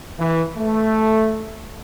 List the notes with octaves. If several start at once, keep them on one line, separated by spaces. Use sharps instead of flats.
E3
A3